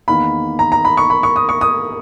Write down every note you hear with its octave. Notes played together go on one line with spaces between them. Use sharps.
E2 D#3 A#3 B5
A#5
A#5
B5
C#6
B5
C#6
D#6
C#6
D#6